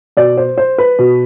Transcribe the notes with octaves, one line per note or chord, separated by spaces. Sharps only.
B2 D5
C5
C5
B4
B2